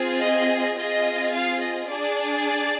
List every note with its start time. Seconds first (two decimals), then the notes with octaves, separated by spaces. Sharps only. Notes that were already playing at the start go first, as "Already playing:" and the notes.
Already playing: C4 F4 G#4
0.20 D#5
0.77 C4 F4 G#4 D#5
1.34 F5
1.61 D#5
1.89 D4 G#4 D5